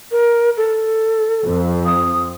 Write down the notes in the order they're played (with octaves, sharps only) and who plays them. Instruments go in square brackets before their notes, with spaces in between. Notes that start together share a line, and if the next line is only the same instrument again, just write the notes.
[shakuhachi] A#4
A4
[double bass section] F2 F3
[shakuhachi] D#6